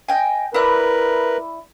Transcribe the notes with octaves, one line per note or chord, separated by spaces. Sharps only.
D#5 G5 G#5
E4 A#4 B4 D5 F#6